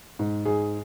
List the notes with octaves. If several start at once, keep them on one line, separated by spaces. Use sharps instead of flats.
G#2
G#2 G#4